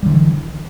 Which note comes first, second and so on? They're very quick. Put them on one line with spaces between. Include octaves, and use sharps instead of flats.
G3 D3 E3